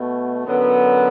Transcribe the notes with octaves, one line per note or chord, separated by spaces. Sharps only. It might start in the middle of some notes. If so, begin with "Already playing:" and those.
Already playing: B2 A3
F#2 D3 F#3 B3